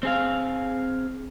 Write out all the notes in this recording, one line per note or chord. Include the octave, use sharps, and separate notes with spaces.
C4 G#4 F5